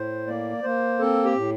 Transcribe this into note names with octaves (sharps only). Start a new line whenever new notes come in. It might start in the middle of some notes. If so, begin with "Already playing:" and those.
Already playing: A2 C5
A#3 D5
A#3 C5
C4 A4
G4
A2